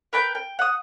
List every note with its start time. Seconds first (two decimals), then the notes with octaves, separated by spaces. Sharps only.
0.13 A#4 B4 G5 G6
0.35 G5
0.59 F#5 D#6